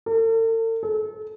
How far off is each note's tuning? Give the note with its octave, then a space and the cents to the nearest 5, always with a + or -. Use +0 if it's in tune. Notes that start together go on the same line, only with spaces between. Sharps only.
A4 +45
A4 -35